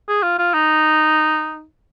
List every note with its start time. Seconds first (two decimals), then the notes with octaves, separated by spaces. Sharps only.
0.08 G#4
0.23 F4
0.39 F4
0.54 D#4